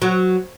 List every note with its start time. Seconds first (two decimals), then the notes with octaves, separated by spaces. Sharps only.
0.02 F#3